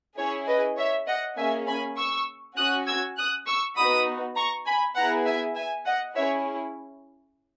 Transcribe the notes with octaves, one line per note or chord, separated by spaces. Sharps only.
C#4 E4 G#4 C#5
B4 D#5
C#5 E5
D#5 F#5
A#3 C#4 G#4 E5 G#5
G#5 B5
C#6 E6
C#4 F#4 D#6 F#6
E6 G#6
D#6 F#6
C#6 E6
B3 D#4 F#4 B5 D#6
A#5 C#6
G#5 B5
B3 E4 G#4 F#5 A#5
E5 G#5
E5 G#5
D#5 F#5
C#4 E4 G#4 C#5 E5